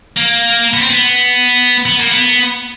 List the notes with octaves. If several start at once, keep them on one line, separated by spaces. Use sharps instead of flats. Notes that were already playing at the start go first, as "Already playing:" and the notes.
A#3
B3
C4
B3
B3
A#3
B3